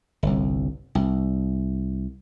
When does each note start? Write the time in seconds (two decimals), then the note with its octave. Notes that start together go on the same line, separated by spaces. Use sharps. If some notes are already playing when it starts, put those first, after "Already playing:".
0.23 G1 C2
0.95 C2